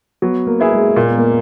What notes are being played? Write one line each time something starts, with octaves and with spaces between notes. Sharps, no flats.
F#3 B3
A#3
B3 E4 G#4
G#3
A#2 A#3
B3
A#3